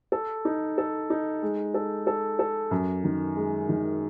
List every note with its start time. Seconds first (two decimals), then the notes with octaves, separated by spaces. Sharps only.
0.12 A4
0.45 D#4
0.78 A4
1.10 D#4
1.42 G#3
1.74 A4
2.07 A4
2.39 A4
2.71 F#2
3.04 D#3
3.37 G#3
3.69 D#3